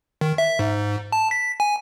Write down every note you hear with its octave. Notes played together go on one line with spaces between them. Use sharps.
D#3
E5
G#2
A5
B6
G#5